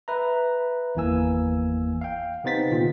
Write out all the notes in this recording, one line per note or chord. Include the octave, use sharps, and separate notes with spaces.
B4 E5 A#5
G1 E2 E3 A#3 G#5 E6
F5 G5
C3 B3 D#4 C5 A6 B6
A#2 D3 F4 G5